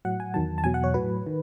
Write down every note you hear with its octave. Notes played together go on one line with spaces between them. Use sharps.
A2 F#3 F#5
G#5
E2 D#3 F#3 A5
A5
E2 B2 F#3 G#5
F#5
C#5
A2 F#3 B4
D#3